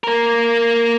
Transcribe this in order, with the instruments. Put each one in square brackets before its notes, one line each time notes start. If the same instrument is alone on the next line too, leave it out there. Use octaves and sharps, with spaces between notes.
[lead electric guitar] A#3 A#4